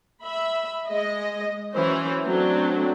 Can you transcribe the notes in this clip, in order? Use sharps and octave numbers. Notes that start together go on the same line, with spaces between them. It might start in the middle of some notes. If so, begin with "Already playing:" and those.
E5 B5
G#3 D#5
E3 F#3 C#4 C5
F#3 A3 C4 D4